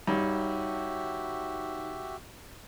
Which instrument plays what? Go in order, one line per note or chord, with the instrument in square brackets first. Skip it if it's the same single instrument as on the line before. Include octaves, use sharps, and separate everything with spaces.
[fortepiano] G2 [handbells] D#4 C#5 [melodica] F#4 G4 E5